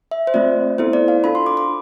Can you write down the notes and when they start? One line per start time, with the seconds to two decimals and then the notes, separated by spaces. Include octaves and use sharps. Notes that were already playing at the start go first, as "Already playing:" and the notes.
0.11 E5
0.27 C5
0.34 A3 C4 F4 D5
0.78 B3 E4 A4 C5
0.93 D5
1.08 F5
1.24 D4 F4 A4 B5
1.35 C6
1.46 D6
1.57 D6